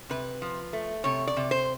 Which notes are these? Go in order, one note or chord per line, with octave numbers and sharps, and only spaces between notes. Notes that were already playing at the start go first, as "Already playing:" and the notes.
C3 B4
F3
A3
C3 C#5
D5
C3
C5